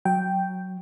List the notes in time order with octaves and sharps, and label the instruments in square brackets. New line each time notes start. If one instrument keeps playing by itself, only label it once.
[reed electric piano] F#3 [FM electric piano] G5